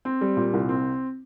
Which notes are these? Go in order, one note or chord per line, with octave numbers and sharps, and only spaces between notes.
C4
G3
A#2
C2
C4